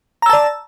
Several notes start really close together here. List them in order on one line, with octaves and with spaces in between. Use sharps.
A#5 E6 A5 D5